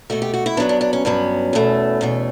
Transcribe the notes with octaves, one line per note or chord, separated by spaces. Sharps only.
B2 A3 F#4
G4
F#4
E4
G2 F#3 B3 D4
D4
D4
C#4
G2 F#3 B3 C#4
E2 B2 A3
E2 B2 A3